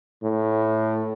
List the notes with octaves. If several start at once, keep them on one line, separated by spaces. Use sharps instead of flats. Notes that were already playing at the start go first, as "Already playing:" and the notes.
A2